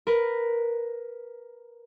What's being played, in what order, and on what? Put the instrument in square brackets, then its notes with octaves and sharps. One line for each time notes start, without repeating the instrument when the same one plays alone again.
[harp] A#4 B4